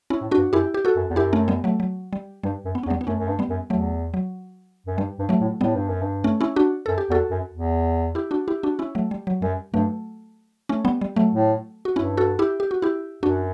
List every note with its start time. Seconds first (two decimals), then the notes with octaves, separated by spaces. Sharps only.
0.10 C#4 E4
0.22 A2
0.31 D4 F#4
0.38 G2
0.53 F#2 E4 G4
0.74 G4
0.85 F#4 A4
0.96 F#2
1.10 E2
1.16 F#2 E4 G4
1.33 A3 C#4
1.48 G3 B3
1.64 F#3 A3
1.80 F#3
2.13 G3
2.44 G2 G3
2.65 F#2
2.75 B3
2.83 C#4
2.86 E2
2.90 G3 B3
3.01 B3
3.07 F#2 A3 C#4
3.19 F#2
3.28 G2
3.39 G3 B3
3.50 F#2
3.70 E2 F#3 A3
4.14 F#3
4.86 F#2
4.98 G2 G3
5.19 G2
5.29 F#3 A3
5.41 A2
5.61 A2 G3 B3
5.75 G2
5.88 F#2
6.02 G2
6.24 A3 C#4
6.41 C#4 E4
6.56 D4 F#4
6.86 F#2 A4
6.98 G4
7.10 E2 F#4 A4
7.31 F#2
7.52 E2
8.15 E4 G4
8.31 D4 F#4
8.48 E4 G4
8.63 D4 F#4
8.79 C#4 E4
8.95 F#3 A3
9.11 G3
9.27 F#3
9.42 F#2 G3
9.74 G2 F#3 A3
10.69 A3 C#4
10.85 G3 B3
11.01 G3
11.16 F#3 A3
11.33 A2
11.85 F#4
11.96 G2 C#4 E4
12.17 F#4 A4
12.39 E4 G4
12.60 G4
12.71 F#4
12.82 E4 G4
13.23 F#2 D4 F#4